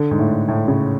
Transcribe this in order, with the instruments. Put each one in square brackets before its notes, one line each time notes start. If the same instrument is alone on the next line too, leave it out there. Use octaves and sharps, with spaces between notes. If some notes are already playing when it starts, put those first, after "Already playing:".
Already playing: [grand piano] D3
G#2
A2
A2
C#3